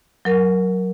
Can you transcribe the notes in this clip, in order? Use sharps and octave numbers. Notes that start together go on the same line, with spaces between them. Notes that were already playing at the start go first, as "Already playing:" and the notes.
F#3 A#4